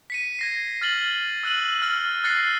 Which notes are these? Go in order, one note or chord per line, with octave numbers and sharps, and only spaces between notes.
B6 C#7 D#7
G#6 A#6 C7
F6 A6 F#7 G7
E6 F#6 D#7 F#7
F6 A6
F6 F#6 A6 A#6 C7 C#7